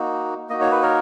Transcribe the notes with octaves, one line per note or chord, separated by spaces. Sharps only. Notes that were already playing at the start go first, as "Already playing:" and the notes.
Already playing: A#3 D#4 F#4
A#3 D#4 F#4 D#5
C#5
B4
A#4 C#5